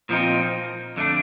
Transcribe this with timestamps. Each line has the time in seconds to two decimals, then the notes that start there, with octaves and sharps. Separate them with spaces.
0.09 A#2 F3 C4 D#4
0.96 F2 D3 A3 D4